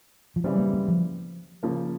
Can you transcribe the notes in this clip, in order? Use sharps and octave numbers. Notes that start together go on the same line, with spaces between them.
F3
C#3 E3 F#3 G3 C4
A#3
A#3
F3
C#3 F3 A#3